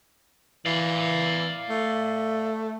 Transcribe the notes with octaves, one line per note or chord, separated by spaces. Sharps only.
E3 D5 F5
A3